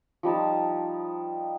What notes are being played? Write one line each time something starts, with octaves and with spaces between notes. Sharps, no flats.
F3 G3 D#4 A5